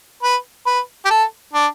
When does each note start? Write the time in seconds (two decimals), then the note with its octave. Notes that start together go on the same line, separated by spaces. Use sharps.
0.22 B4
0.66 B4
1.05 G4
1.10 A4
1.53 D4